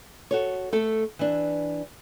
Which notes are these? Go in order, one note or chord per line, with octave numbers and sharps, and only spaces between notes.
F#4 A4 C#5
A3 A4
E3 D4